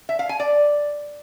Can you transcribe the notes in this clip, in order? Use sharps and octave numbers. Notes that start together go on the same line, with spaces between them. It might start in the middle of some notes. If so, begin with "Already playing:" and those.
E5
F5
G#5
D5